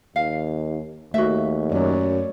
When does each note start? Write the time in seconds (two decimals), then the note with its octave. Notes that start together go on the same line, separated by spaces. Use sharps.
0.16 D#2 F5
1.14 D#2 A3 F#4 E5
1.72 F#2 C#5 D5